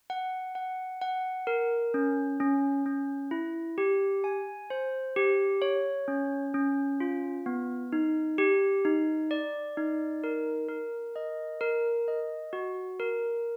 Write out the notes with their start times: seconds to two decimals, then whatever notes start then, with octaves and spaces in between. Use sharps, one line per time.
0.10 F#5
0.55 F#5
1.02 F#5
1.47 A#4
1.94 C#4
2.40 C#4
2.86 C#4
3.31 E4
3.78 G4
4.24 G#5
4.70 C5
5.16 G4
5.62 C#5
6.08 C#4
6.54 C#4
7.00 F4
7.46 B3
7.93 D#4
8.38 G4
8.85 D#4
9.31 D5
9.77 D#4
10.24 A#4
10.69 A#4
11.16 D#5
11.61 A#4
12.08 D#5
12.53 F#4
13.00 A#4